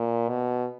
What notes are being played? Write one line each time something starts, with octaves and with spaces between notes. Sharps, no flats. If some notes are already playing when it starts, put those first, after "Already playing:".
Already playing: A#2
B2